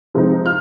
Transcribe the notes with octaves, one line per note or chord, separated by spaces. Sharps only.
C3 F3 G#3 C4 D#4
F4 F6